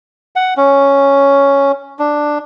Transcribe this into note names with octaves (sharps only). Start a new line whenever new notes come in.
F#5
C#4
D4